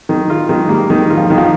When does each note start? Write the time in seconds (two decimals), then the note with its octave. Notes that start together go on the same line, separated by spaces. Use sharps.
0.09 D#3
0.30 F4
0.49 D#3 G#3
0.69 G3 A#3
0.90 D#3
1.10 F4
1.17 F3
1.30 D#3
1.38 F3